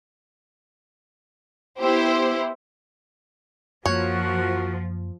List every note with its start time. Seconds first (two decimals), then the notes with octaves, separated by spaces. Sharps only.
1.80 B3 E4 G4 C5
3.86 F#2 F3 A#3 F#4 A#4 C#5